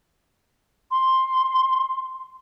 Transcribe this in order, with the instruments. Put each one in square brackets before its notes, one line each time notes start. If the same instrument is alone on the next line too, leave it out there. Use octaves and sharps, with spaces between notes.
[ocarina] C6